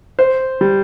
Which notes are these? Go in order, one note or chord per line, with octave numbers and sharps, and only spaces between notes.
C5
G3